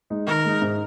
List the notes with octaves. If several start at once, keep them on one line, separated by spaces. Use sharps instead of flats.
G#3 D#4
D#3 A#4
G#3 D#4
G#2